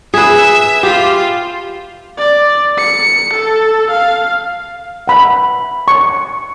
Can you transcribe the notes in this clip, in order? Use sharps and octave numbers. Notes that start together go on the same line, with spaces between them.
G#4 B4 E5 E6
F4 G4
D5
C#7
A4
F5
F#5 B5
C#6